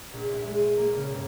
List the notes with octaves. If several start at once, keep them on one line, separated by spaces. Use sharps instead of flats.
A#1
E4
G#3
D#7
A#3
C#3
G1